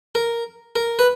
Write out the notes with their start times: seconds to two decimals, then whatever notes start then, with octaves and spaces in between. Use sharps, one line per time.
0.15 A#4
0.76 A#4
0.99 B4